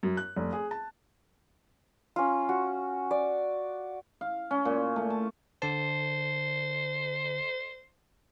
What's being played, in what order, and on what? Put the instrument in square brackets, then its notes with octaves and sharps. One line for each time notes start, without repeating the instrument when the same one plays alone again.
[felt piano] F#2
F#6
F1
G#4
A5
[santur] C#4 F4
F#4
D5
[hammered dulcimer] F5
C#4
A#2
A3
A5
[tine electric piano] D3 A5 [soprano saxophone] C5